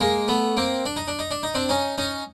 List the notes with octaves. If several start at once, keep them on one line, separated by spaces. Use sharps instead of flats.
G#3 A#3
A3 B3
A#3 C4
D4
D#4
D4
D#4
D4
D#4
C4 D4
C#4 D#4
C#4 D#4